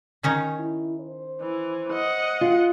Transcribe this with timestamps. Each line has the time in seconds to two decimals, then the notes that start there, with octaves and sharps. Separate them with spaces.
0.23 D#3 C#4 D#4
0.59 E4
1.01 C5
1.40 E3
1.93 D#5 F#5
2.41 F4